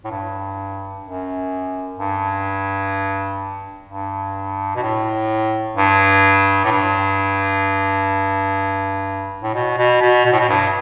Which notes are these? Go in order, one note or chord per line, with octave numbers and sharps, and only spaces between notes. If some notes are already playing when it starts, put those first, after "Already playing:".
A2
G2
F#2
G2
G2
B2
A2
G2
A2
G2
A2
B2
B2
B2
B2
A2
B2
G2